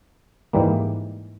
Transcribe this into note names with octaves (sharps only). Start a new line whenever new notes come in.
G#2 E3 G3 A#3